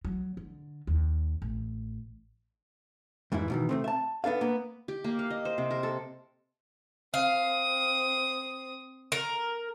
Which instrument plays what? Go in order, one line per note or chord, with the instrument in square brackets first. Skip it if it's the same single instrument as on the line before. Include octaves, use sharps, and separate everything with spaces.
[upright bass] F#3
D3
D#2
A1
[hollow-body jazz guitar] F2 G#2 C3 E3 E4
B2 D#3 E3
C3 A3 C4
E5 A5
B3 D4 A4 F5
A#3 B3
[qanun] G4
A#3
F5
D#5
C5
C3
A#4
A4
[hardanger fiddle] C4 D#6 [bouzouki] F5
[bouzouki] A#4